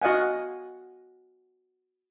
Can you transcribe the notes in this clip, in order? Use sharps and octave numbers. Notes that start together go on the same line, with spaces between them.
F#4 D#5 F5 F#5 G#5